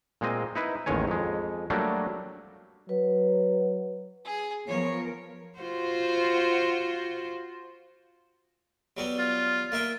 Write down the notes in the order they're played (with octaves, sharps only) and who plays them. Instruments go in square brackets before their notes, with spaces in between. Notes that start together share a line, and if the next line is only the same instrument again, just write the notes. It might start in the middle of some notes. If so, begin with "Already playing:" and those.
[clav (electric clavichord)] A#2 G#3 C4 D#5
D#4 E4 B4
A1 D#2 D#3 G#3 C#5 G#5
F2 G#3
F#3 G3 A3 A#3 D4
[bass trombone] F#3 [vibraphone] B4
[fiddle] G#4
[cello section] F3 B3 A#4 [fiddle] C#5
[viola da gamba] F4 F#4 C5
[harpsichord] F#3 G3 B3
[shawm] F4
[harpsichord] A#3 E5 G5